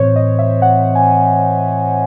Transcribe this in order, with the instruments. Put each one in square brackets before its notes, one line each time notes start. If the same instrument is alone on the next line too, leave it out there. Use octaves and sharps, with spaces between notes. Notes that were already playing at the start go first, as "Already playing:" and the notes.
Already playing: [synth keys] A2 E3 C4 C5 C#5
D#5
E5
F#5
G#5